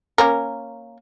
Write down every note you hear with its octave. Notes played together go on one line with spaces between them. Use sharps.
A#3 C#4 A#4